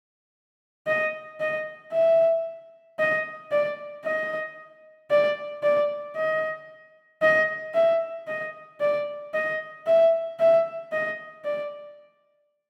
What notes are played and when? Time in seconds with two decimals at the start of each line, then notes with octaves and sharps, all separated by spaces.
0.87 D#5
1.40 D#5
1.92 E5
2.99 D#5
3.51 D5
4.05 D#5
5.11 D5
5.63 D5
6.16 D#5
7.22 D#5
7.74 E5
8.27 D#5
8.81 D5
9.34 D#5
9.87 E5
10.40 E5
10.92 D#5
11.45 D5